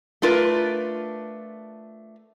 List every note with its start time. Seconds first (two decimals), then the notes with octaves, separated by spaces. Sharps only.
0.22 A3 D4 F4 A#4 B4